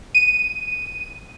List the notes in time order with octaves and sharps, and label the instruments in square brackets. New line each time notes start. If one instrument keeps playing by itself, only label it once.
[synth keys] D#7